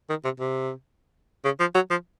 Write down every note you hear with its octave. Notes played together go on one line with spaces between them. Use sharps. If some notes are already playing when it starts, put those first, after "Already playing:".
D#3
C3
C3
C#3
F3
F#3
F3